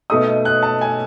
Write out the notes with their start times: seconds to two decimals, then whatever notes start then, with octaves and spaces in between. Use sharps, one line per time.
0.10 B2 A3 D#4 D#6
0.45 F#6
0.63 A5
0.81 G#5